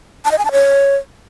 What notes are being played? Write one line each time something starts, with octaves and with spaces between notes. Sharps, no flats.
A5
D#5
G#5
A5
C#5